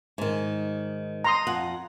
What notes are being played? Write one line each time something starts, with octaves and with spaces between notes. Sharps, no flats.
G#2 D#3
A#5 C6 D#6
F2 F#5